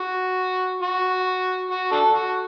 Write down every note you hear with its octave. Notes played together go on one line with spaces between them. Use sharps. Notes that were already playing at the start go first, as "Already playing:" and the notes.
Already playing: F#4
F#4
F#4
D4 F#4 A4
F#4